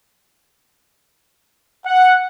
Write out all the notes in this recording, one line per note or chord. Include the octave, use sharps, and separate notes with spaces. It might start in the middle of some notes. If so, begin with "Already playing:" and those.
F#5